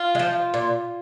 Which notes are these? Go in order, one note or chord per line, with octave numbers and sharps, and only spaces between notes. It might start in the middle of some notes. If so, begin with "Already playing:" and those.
Already playing: F4
G#3
F3
A#2